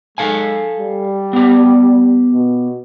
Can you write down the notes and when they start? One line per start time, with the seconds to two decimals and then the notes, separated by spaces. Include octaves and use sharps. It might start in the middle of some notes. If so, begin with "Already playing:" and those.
0.18 G#3 A4 F5 G#5
0.80 G3
1.33 B3 G4
2.33 B2